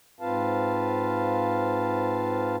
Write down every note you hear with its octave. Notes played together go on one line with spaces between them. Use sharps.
G#2 C4 F4 B4 F5 A5